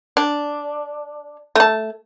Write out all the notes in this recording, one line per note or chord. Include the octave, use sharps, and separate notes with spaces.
D4
A3 A5